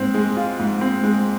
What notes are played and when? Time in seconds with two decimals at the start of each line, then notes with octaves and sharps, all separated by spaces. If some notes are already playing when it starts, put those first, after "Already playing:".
Already playing: G#2 C4
0.14 G#3
0.36 F4
0.59 G#2
0.81 C4
1.03 G#3